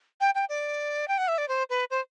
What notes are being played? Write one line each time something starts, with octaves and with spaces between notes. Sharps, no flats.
G5
G5
D5
G5
F#5
E5
D5
C5
B4
C5